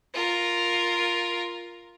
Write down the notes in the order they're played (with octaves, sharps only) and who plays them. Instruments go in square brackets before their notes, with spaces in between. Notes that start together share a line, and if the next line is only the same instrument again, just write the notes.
[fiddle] F4 A#4